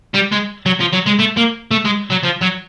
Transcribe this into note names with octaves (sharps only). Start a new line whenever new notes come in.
G3
G#3
F#3
F3
F#3
G#3
A3
A#3
A3
G#3
F#3
F3
F#3